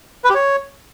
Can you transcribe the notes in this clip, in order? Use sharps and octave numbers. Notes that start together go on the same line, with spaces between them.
B4
G4
C#5